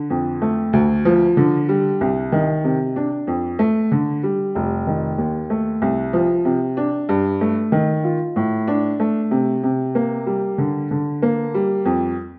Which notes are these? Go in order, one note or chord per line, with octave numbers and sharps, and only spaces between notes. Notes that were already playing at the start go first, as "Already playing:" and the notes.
Already playing: D3
F2
A3
D2
F3
D3
G3
C2
D#3
C3
D4
F2
A3
D3
G3
F1
D#3
D#2
A3
C2
F3
C3
D4
G2
A3
D#3
F4
A2
D4
A3
C3
C3
A#3
G3
D3
D3
A#3
G3
F2